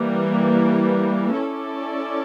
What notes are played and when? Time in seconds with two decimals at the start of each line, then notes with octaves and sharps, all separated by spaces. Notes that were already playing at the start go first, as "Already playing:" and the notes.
Already playing: E3 G3 A#3
1.38 C#4 E4 A4 D5